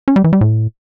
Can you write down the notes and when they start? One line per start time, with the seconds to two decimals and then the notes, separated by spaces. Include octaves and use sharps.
0.08 C#4
0.16 G3
0.24 E3
0.33 G3
0.41 A2